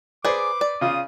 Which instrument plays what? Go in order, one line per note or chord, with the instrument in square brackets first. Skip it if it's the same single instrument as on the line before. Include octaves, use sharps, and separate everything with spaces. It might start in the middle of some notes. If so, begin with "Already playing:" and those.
[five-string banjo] G#4 D5 [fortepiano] B4 C5 [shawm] D6
[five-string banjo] D5
[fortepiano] C#3 F4 [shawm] D#6